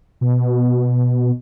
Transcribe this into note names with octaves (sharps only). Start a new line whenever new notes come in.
B2